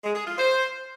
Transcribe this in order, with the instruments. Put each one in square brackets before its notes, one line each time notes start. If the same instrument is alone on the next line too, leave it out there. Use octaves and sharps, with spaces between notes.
[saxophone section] G#3
G#4
F4
C5